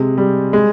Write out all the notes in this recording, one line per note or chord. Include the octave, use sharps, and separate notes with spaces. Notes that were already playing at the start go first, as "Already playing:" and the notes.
Already playing: C3 G#3
G3
G#3